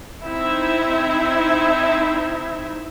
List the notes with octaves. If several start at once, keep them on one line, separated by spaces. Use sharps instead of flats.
C4 D#4 E4 E5